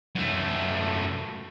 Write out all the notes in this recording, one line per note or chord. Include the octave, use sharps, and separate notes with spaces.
F#2 A3